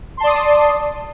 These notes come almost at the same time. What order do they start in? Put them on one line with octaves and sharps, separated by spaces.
C6 A5 D5 D#6